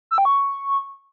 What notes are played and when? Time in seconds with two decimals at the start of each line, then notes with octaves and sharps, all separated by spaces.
0.11 E6
0.18 G5
0.25 C#6